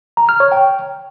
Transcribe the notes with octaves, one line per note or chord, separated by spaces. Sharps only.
A#5
F6
C#5
G5